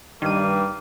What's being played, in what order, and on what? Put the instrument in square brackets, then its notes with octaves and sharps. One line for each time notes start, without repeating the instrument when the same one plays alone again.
[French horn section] G2 [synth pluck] D#3 D#7 [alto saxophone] G3 [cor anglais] A#3